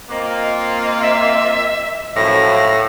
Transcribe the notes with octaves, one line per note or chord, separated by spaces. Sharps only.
A#3 C4 F4 D#5
E5
F#2 A2 F3 E4 A#6